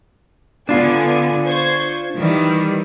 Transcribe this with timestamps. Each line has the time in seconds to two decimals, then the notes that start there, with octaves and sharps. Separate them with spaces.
0.69 D3 B3 D4 F4 G#5
1.46 C5 C#6 G#6
2.16 D#3 E3 G3